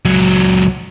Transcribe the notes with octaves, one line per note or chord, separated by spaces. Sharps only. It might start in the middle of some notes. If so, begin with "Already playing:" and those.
C#2 F#3